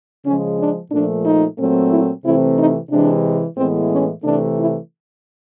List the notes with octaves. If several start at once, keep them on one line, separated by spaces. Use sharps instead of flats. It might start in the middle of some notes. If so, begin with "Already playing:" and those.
C#3 F3 G#3 C#4
D4
A#2 F3 A3 D4
D#4
A#2 F#3 A3 C4
E4
C3 E3 A3 C4 E4
D#4
C3 E3 G#3 D4
A2 E3 G#3 B3 C4
C#4
C3 E3 A3 D4
E4